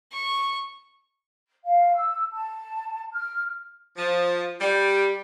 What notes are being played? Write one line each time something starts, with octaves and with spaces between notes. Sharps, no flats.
C#6
F5
E6
A5
F6
F3
G3